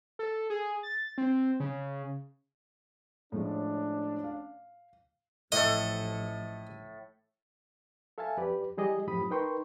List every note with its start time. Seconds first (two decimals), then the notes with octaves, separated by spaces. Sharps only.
0.19 A4
0.50 G#4
0.83 A6
1.18 C4
1.60 C#3
3.32 A2 F3 G#3 C#4 D4
4.24 F5
5.52 A1 A2 F3 A4 D#5
8.18 A4 E5 F5 G#5 A5
8.37 F2 G4 B4 D5
8.77 E3 G3 G4 G#4 D5 D#5
9.07 F#2 A2 F3 G4 B5 D#6
9.30 D#4 A#4 B4 G5 C6 C#6